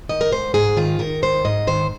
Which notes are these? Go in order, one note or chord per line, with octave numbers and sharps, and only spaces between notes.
D#3 D#5
A#4
G#2 C5
G#2 G#4
D#3 F4
D#3 A#4
G#2 C5
G#2 D#5
D#3 C5